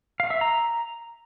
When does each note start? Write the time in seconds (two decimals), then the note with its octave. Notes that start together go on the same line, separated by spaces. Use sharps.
0.20 F5
0.30 E5
0.41 A#5